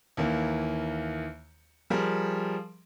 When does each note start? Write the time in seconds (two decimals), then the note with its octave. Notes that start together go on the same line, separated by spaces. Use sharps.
0.17 D#2 E3 A#3
1.90 F3 G3 G#4 A#4